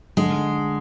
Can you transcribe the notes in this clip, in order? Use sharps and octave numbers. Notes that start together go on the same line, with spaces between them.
D3 G#3